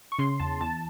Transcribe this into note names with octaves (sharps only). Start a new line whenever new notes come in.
C#6
C#3 C6
E2 A5
E2 A5